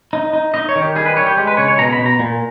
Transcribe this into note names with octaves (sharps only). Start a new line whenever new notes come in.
D#4
D#4
D#4 D#5
C#5
D#3
G4
G3 G#4
B4
G3 C#5
G4
G#3
B4
C#3 C#5
C#5
B2 A#5
B5
B2
A#5
A#2